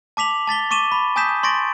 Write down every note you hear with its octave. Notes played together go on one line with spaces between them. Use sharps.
A5 D6 B6 F7 F#7
A5 A6 B6 G7
C#6 D6 D#7 E7 G7
B5
G#5 A5 D#6 G6 B6 E7
C6 C#6 A6 A#6 D7